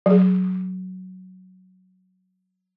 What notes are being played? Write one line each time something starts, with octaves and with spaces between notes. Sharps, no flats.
F#3 G#4